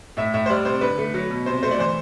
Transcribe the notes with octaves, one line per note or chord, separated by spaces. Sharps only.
A2 E5
A2 E5
C5
G3 D5
C3 C5
D3 B4
A3
F#3
B2
C3 C5
A3 C5
D5
E3 C5